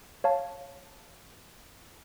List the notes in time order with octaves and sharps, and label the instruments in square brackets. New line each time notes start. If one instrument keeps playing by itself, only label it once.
[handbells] C#5 F5 A5